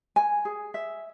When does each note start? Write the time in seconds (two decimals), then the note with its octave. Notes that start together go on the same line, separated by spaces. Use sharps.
0.16 G#5
0.45 G#4
0.74 E5